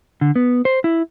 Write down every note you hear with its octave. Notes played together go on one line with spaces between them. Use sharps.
D3
B3
C5
E4